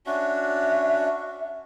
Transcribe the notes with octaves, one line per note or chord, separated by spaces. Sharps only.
C#4 D4 F#4 E5